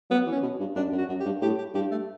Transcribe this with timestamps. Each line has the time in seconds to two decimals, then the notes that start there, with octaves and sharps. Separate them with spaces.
0.10 F#3 B3
0.26 E3
0.32 C#4
0.42 B2
0.60 G2
0.75 F#2 D4
0.92 F#2
0.98 F#4
1.08 F#2
1.20 G4
1.25 G2
1.41 A2 G4
1.58 G4
1.74 G2 G4
1.91 A3